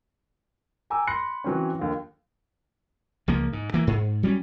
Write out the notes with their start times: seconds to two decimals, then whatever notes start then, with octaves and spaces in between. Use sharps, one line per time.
0.90 G5 G#5 A#5 D6 E6
1.07 B5 C6 F#6 A#6 C#7
1.44 E3 F#3 C4 C#4
1.79 D#2 D3 F3
3.28 C#2 F3 A#3
3.53 G#2
3.74 E3 A#3
3.87 G#2
4.23 F#3 G3 A#3 C#4